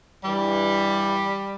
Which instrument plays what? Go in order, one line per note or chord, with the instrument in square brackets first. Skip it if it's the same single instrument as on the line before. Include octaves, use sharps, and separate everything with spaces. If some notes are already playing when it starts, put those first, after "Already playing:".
[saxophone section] G2 E3 G3